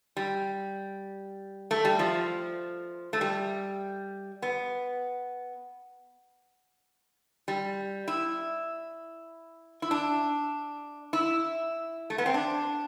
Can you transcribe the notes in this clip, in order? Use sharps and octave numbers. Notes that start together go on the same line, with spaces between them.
G3
A3
G3
F3
A3
G3
B3
G3
E4
E4
D4
E4
A3
B3
C4
D4